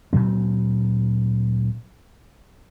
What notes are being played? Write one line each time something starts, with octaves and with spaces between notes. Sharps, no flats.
D2 A#2 F#3 C4